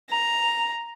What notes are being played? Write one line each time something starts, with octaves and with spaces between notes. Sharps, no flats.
A#5